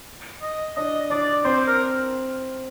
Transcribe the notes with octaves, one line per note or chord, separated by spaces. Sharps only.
D#5
D4 D#5
D4 D5
C4 C5
A#4